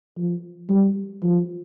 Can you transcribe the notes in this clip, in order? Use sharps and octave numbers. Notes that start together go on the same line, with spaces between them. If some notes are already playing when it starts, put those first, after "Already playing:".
F3
G3
F3